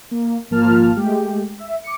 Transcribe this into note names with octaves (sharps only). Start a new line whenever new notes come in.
A#3
G#1 F3 A#3 F4 A5 F6
G#3 A3 G4
E5
D6 C#7